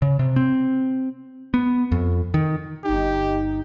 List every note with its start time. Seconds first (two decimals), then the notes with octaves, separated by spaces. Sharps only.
0.02 C#3
0.19 C3
0.36 C4
1.54 B3
1.92 F2
2.34 D#3
2.84 G1 D#4 G4